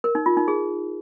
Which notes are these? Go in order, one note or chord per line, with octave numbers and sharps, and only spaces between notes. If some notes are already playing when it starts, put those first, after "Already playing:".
A#4
D#4
F4
D#4
G#4